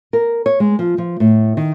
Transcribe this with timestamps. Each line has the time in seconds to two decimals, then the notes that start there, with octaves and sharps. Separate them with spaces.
0.13 A#4
0.46 C#5
0.60 G#3
0.79 F3
0.98 F3
1.20 A2
1.57 D#3